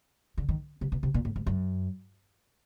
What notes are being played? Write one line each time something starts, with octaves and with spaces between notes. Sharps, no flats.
D3
D#3
C3
B2
C3
A#2
A2
G#2
F#2